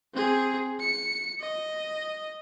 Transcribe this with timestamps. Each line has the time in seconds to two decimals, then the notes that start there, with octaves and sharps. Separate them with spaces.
0.14 C4 G#4
0.80 C#7
1.40 D#5